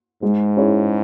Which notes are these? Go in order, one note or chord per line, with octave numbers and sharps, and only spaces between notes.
G#2 G#3
C#4 E4 G#4 C#5